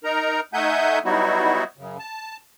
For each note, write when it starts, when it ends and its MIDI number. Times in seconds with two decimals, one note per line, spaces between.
0.04 0.40 63
0.04 0.40 70
0.04 0.40 82
0.53 0.99 57
0.53 0.99 63
0.53 0.99 76
0.53 0.99 78
0.53 0.99 80
0.53 0.99 91
1.04 1.64 54
1.04 1.64 55
1.04 1.64 59
1.04 1.64 63
1.04 1.64 64
1.04 1.64 66
1.77 1.98 42
1.77 1.98 49
1.99 2.37 81